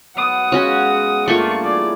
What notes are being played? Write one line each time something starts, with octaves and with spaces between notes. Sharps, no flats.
F#3 B3 F#5 D#6
G#3 C#4 F#4 C#5 F5
G2 A3 A#3 F4 C#6
E3 G#4 C#5 D5